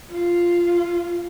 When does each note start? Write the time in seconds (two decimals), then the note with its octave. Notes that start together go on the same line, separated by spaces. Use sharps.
0.11 F4